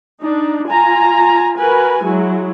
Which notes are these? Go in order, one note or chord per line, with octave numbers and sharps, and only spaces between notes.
D4 D#4
F4 G#5 A#5
F#4 A#4 B4 G#5
F#3 G#3 E4